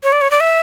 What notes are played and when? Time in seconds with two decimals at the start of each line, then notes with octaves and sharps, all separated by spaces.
0.03 C#5
0.12 D5
0.21 C#5
0.31 D5
0.40 E5